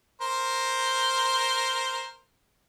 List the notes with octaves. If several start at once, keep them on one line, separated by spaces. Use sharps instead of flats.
A#4 C5